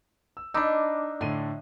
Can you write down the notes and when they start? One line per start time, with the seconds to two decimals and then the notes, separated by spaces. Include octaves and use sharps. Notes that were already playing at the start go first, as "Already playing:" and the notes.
0.37 E6
0.54 D4 D#4 B5 D6 E6
1.21 A2 D3 C6 D#7